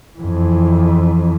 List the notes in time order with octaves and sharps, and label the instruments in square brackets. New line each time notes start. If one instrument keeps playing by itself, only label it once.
[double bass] F2 E3